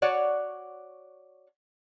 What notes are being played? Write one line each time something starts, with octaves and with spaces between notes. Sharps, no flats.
F#4 C#5 D5 F#5